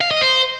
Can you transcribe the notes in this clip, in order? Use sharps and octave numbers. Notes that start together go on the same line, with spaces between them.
F5
D#5
C5